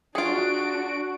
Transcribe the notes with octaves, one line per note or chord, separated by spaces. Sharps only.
D4 F4 F#4 G#4 D7